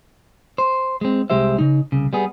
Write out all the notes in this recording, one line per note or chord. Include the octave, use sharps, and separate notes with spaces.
C5
G#3 C4
C2 G#3 G4 C5 E5
C#3 D#4
C2 C#3
G3 B3 G#4